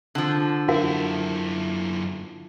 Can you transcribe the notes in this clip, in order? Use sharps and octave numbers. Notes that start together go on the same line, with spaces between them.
D3 F3
F#2 E4 F#4 A#4 F#5